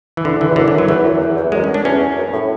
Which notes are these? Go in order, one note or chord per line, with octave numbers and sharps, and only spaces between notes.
E3
D3
E3
E2
F#2 D3
E3
F#2
F#3
E2 E3
F#2
E2
E2
F#2 G#3
C#4
D4
E2 C#4
F#2
A2